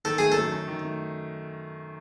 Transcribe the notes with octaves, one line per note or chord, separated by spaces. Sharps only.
D#3 A4
A3 G#4
F#2 A4
F#2
D#3
A3